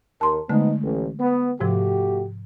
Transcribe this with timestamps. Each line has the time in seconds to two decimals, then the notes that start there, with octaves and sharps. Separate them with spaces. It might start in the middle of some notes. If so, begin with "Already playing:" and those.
0.21 D#2 A#4 A5 C6
0.49 D3 F3 G#3 A3 B3 D#4
0.82 A1
1.20 B3
1.61 G#2 C3 F3 A3 F#4 G4